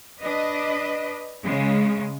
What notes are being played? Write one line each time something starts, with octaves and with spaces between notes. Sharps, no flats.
D4 B4 D#5
C#3 G#3